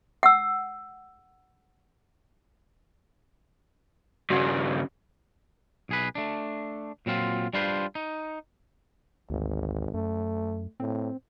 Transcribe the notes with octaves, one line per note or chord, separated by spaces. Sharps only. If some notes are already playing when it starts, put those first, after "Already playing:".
F#5 E6
G2 C#3 F#4 F#5
B1 G#4 B4
A3 D4
A#2 F#3 C4 F4
G3 D4 F4 B4 C5
D#4
G#1 D2
F#2 A3
A2 C4